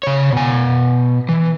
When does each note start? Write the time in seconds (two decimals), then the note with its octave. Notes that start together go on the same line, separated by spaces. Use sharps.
0.03 C#3 C#5
0.33 B2 G#5
1.29 E3